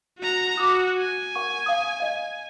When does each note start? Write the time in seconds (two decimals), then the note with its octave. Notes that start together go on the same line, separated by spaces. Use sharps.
0.19 F#4 A#5
0.57 F#4 D6 D#6
0.98 G#5
1.35 A#4 F#5 C#6
1.66 F5 A5 D#6
2.00 D#5 F5